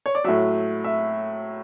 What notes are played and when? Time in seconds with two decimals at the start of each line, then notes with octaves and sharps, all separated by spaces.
0.06 C#5
0.15 D5
0.24 A2 F#3 E5
0.84 E5